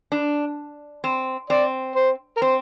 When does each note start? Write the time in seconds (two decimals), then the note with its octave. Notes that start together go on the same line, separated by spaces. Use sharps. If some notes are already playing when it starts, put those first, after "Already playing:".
0.12 D4
1.04 C4
1.50 C4 D5
1.96 C5
2.37 A#4
2.42 C4 C5